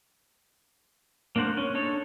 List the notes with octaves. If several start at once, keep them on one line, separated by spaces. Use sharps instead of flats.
A#3 D4 F#4 C5 F#5
C#4
D4 D#4 A4 C#5